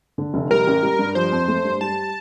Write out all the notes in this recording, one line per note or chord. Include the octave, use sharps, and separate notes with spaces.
D3
F1
G3 A#4
A1
G3
G2
F3 C5
F2
A3
G2
G3 A5